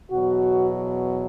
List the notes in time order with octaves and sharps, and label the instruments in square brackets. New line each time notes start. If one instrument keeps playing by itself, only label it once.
[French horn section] E2 B2 F#3 F#4